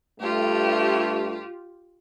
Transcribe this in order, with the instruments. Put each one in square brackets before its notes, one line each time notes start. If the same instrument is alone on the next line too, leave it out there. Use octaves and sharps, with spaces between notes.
[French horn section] G2 A3 [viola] F4 G4